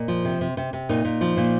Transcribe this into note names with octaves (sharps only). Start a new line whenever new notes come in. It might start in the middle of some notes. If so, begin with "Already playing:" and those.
Already playing: A#2 D#5
F3
C3
C3
C3
C3
A#2 D#4
A#2
F3
A#2